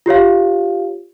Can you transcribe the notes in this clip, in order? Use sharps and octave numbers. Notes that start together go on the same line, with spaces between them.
F4 G4 C#5 F5